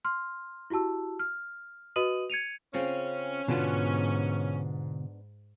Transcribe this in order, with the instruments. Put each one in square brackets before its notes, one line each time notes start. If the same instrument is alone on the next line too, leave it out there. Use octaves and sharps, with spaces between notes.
[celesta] C6 F6
E4 F#4 G4 A5 E6
F6
F#4 B4 D#5 D#6 D#7 F#7
G#6 C#7 D#7 F7
[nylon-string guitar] C#3 C4 F4 [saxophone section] C#4
[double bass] G#2 [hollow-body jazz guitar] B2 D3 F4 [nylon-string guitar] B3 D4